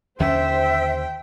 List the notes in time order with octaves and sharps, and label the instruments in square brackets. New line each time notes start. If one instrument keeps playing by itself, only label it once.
[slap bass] D#2 D3 C#4 [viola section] C5 [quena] E5 [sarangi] G5